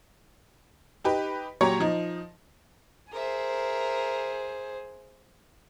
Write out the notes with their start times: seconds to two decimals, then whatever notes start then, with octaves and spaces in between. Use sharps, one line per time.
1.04 D#4 G4 B4
1.61 A#2 F#3 G4 C#5 A#5 C#6
1.80 F3 D#4
3.12 G#4 A#4 C5 E5